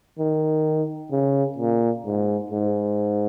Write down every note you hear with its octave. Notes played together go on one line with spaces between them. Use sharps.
D#3
C#3
A#2
G#2
G#2